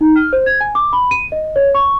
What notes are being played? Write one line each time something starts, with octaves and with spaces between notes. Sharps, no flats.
D#4
F6
C5
G#6
G#5
D6
B5
D#7
D#5
C#5
C#6